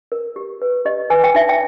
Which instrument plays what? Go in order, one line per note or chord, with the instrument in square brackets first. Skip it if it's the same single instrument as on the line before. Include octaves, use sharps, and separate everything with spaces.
[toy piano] A#4
G4
B4
G4 D#5
B4 G#5
G5
D#4 E5
G5